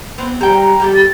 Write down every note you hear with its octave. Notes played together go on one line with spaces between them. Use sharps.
B3 C4
G3 G5 A#5
A#5
G3 G4 A4
A6